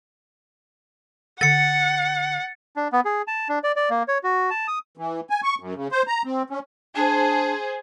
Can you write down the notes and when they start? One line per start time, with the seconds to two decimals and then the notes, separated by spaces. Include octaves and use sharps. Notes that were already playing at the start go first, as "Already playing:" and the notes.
1.41 D3 F#5 A6 C#7
2.76 D4
2.93 B3
3.05 G#4
3.27 A5
3.49 D4
3.64 D5
3.76 D5
3.90 A#3
4.08 C#5
4.24 F#4
4.50 A5
4.68 D#6
4.97 E3
5.30 G#5
5.43 C#6
5.60 F#2
5.75 C#3
5.92 C5
6.07 A#5
6.25 C4
6.50 C#4
6.95 D4 G#4 C5